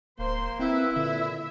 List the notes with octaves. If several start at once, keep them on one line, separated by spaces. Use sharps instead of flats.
D1 A#3 C5 C6
C4 E4 B4 E5
A#2 D3 E5